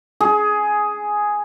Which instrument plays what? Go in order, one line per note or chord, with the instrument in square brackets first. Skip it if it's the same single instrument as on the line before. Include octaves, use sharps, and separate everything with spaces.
[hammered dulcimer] G#4